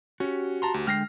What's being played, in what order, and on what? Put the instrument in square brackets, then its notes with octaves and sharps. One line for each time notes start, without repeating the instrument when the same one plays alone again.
[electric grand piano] C#4 [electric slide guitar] F#4 G4
[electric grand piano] A5 A#5 C6
D2
[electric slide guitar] D3 G#3 G5 [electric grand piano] F6 A#6 C7